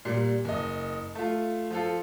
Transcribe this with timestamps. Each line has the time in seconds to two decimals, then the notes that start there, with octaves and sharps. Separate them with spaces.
0.05 A#2 G3
0.45 F#1 D#5
1.15 A3 F4
1.70 F3 F4 A4